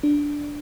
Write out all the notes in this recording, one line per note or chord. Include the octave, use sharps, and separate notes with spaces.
D4